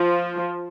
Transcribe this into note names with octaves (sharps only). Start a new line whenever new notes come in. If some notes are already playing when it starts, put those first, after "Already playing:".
Already playing: F3